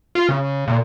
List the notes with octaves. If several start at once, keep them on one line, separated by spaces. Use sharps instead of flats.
F4
C#3
A#2